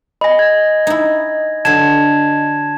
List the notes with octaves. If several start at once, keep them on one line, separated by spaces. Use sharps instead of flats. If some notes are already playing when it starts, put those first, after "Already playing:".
D#5 G#5 B5 A#6
G#6
D#4 E4
D3 F#3 A5 G#6 E7